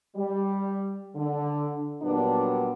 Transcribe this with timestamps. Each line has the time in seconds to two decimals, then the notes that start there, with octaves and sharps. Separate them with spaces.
0.16 G3
1.16 D3
2.03 A#2 F#3 G3 B3 D4